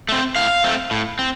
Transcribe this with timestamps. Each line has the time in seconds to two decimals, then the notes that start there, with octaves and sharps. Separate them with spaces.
0.09 A3 C4
0.36 A2 F5
0.64 A3 C4
0.91 A2
1.19 C4